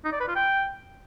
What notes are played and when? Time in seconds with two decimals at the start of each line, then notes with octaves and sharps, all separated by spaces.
0.05 D#4
0.12 D5
0.20 B4
0.28 F4
0.36 G5